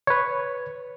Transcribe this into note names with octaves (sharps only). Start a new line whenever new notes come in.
B4 C#5